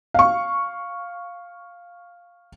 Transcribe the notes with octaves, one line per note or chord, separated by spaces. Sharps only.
F5 C#6